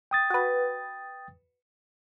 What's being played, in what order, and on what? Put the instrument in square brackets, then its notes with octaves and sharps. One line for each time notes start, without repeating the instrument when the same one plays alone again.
[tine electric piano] G5 D#6 A6
[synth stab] F#4 B4